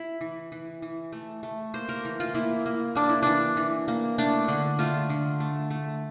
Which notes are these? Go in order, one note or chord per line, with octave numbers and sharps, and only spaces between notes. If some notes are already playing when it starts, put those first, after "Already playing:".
Already playing: E4
E3
E3
E3
A3
A3
A#3 C5
A#4
E3
F4
A#3 E4
A#3
A#3 D4
E4
E3 D4
E3
A#3
A3 D4
D3
A3 F4
D3
A3
A3